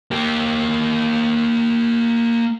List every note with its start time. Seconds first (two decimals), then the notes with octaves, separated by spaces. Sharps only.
0.11 A#3 G4